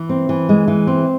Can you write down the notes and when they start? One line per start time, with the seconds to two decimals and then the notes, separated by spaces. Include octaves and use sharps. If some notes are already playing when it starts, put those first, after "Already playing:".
Already playing: E3
0.09 C4
0.29 E3
0.49 G#3
0.68 E3
0.87 C4